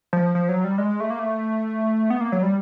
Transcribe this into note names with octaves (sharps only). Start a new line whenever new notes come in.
F3
F3
F#3
G3
G#3
A3
A#3
A3
B3
A#3
F#3
G3